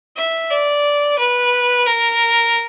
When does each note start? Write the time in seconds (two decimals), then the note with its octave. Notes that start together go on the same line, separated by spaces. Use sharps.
0.17 E5
0.50 D5
1.19 B4
1.86 A#4